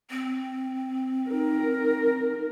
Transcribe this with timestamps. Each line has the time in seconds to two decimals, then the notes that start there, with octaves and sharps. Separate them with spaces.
0.10 C4
1.30 D#4 A#4